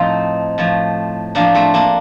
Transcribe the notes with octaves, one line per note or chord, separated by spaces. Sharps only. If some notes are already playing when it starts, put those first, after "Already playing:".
Already playing: A2 F3 C4 D#4
A2 F3
A2 F3 A#3 D4
A3 C4
A#3 D4